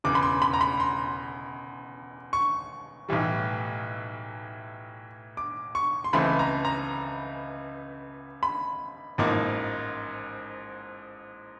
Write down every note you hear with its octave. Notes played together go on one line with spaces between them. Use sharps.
E1 E2 C#3 D6
B5
C6
B5
A#5
B5
C6
C#6
B1 A2 E3 G3
D6
C#6
C6
C#2 C#3 E3 A3 C4 B5
A#5
A#5
B5
A1 G#2 F3 A#3 D#4